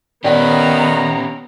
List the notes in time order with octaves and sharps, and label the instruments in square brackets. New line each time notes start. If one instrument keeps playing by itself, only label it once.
[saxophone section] D#3 F#5 [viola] B3 A#5 [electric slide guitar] C#4 G4 [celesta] D5 G5